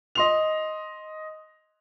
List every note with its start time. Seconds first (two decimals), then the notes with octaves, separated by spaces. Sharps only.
0.15 D#5 C6 F7